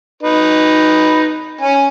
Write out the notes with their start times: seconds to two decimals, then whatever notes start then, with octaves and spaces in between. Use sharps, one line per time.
0.23 D#4 B4
1.61 C#4 G#5